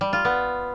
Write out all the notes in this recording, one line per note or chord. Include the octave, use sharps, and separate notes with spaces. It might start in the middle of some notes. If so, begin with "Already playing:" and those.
G3
F4
B3